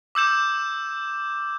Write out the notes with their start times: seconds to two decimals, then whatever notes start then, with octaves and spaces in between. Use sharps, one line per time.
0.15 D6 E6 G6 E7